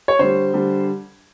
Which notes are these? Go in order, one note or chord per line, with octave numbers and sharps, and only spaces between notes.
C#5
D3 G3 C5
D3 G3